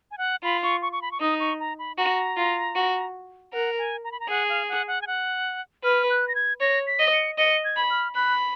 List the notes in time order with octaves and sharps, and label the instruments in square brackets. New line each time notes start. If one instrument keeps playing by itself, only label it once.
[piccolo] G#5
F#5
[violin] F4 [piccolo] B5
[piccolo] C#6
C#6
C#6
B5
C#6
[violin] D#4 [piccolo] D#6
[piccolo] C#6
A#5
B5
[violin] F#4 [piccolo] A#5
[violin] F4
F#4
[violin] A#4 [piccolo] F#5
[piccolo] G#5
A#5
B5
A#5
[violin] G#4 [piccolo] F#5
[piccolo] F5
F#5
F#5
G#5
F#5
[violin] B4 [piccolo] F6
[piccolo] F#6
A#6
G#6
[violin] C#5 [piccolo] A#6
[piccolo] B6
[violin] D#5
[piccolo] C#7
[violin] D#5 [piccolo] C#7
[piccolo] G#6
[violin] B5
[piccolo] F6
[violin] B5 [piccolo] F#6